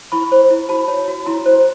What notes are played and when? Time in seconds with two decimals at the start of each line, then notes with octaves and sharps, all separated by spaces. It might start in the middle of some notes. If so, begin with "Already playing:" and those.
0.12 E4 B5 C#6
0.32 C5
0.50 E4
0.69 F#4 A5 B5
0.88 C#5
1.08 F#4
1.26 E4 A#5 C6
1.46 C5